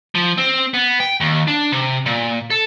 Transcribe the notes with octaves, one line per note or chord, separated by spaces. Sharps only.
F3
C4
B3
G5
D#2
D4
C3
A#2
A4